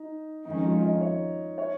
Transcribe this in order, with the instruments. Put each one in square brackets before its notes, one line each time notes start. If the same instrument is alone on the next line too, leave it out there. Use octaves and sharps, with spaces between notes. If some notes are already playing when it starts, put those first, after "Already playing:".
Already playing: [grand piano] D#4
[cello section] F2 D#3 G#3 C#4 [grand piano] D#4
[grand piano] F4
D#5
C#5
C#5